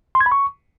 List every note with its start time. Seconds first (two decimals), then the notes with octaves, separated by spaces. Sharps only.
0.15 C6
0.21 G#6
0.26 B5
0.32 C#6